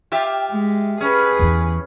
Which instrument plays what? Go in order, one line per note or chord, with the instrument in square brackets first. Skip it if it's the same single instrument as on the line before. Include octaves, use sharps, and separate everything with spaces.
[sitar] F4 G4 E5
[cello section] G#3
[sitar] C#4 [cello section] G#4 B4
[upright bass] E2 E3